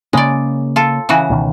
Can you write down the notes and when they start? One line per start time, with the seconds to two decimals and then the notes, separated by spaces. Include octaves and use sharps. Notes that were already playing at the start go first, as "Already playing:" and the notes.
0.13 C#3 G#3 A#3 C#4 D5
0.76 F4 A4
1.09 C#3 E3 F#4
1.30 C#2 B2 D#3